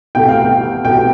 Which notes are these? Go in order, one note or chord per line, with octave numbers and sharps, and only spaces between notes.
C2 B2 A3 G5
F5
G5
C2 B2 A3 G5